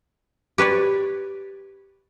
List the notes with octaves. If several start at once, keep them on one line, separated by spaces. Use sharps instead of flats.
G4 B4 C#5 D5